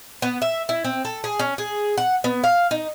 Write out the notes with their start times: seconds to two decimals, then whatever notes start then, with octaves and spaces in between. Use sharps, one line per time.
0.22 B3
0.42 E5
0.69 E4
0.84 C4
1.05 A4
1.24 G#4
1.39 C#4
1.58 G#4
1.98 F#5
2.24 B3
2.44 F5
2.71 D#4